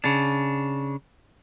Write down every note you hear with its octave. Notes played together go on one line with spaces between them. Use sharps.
C#3 D4